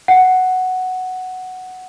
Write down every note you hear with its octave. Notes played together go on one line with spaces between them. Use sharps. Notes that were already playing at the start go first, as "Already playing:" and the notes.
F#5